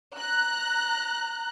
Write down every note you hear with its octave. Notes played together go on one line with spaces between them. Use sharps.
A#5 F#6